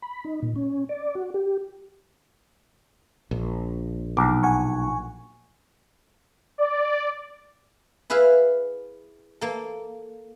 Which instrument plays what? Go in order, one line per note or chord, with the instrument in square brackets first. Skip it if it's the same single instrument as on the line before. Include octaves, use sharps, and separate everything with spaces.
[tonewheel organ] B5
D#4
A#2
C#4
D5
F#4
G4
[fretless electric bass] A#1
[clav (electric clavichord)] B1 [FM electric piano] D6
[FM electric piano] F#5 G#5 C#6
[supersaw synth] D5
[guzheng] E4 G#4 B4 E5 F5
A#3 A4